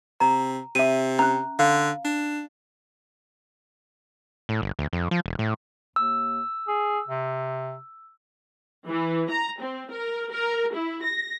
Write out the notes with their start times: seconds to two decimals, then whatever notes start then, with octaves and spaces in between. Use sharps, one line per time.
0.20 C3 A#5
0.75 C3 E5 D#7
1.19 C#4 A#5 F#6
1.59 D3 F5
2.04 D4
4.49 A2
4.62 G1
4.79 D2
4.93 F2
5.11 F3
5.26 E1
5.39 A2
5.96 D#2 E6
6.68 G#4
7.08 C3
8.87 E3
9.30 A#5
9.61 C4
9.91 A#4
10.31 A#4
10.74 E4
11.03 A#6